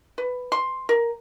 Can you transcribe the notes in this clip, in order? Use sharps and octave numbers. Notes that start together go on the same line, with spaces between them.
B4
C6
A#4